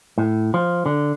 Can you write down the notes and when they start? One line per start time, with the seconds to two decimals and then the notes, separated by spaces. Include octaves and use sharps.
0.18 A2
0.54 F3
0.86 D3